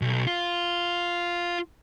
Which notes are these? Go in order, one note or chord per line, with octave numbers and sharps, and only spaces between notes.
B1
F4